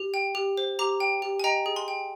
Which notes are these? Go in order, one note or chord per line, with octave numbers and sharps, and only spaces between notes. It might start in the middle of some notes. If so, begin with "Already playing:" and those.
Already playing: G4
G5
G4
C5
G4 A#5 D6
G5
G4
G#5
D#5 G5 A#5
G#4
G#5 C6
G5